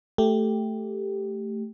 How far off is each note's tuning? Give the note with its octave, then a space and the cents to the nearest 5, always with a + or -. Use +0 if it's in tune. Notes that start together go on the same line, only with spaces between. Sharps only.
A3 +0 G4 +0